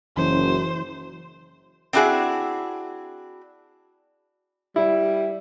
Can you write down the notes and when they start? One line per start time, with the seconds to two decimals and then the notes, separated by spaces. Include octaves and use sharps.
0.17 F#1 F#2 E3 E4 C5
1.93 C4 D4 E4 F#4 G#4
4.76 G3 E4